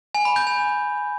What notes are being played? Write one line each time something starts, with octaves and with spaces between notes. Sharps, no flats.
G#5
B5
G6
G#5